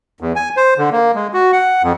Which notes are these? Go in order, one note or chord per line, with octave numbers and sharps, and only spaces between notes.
E2
G#5
C5
D3
A#3
G#3
F#4
F#5
F2